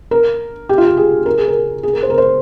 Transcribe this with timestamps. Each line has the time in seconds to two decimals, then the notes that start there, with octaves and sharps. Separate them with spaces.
0.11 A#4
0.69 G4
0.78 F4
0.87 G4
0.97 G#4
1.26 A#4
1.38 G#4
1.48 A#4
1.83 G#4
1.93 A#4
2.03 C5
2.10 A#4
2.18 C5